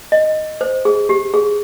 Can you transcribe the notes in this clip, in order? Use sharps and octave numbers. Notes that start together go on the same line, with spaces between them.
D#5
C5
G#4
G4
G#4